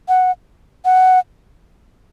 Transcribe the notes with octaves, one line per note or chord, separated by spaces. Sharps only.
F#5
F#5